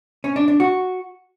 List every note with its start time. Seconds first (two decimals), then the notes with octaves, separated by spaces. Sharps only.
0.24 C#4
0.36 D4
0.48 D4
0.60 F#4